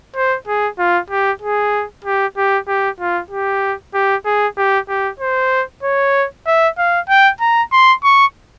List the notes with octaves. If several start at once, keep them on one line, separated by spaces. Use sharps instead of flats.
C5
G#4
F4
G4
G#4
G4
G4
G4
F4
G4
G4
G#4
G4
G4
C5
C#5
E5
F5
G5
A#5
C6
C#6